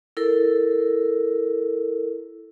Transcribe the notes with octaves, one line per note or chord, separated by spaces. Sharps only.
E4 A4 A#4